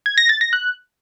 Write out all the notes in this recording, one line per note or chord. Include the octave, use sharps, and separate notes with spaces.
G#6
A#6
A6
A#6
F#6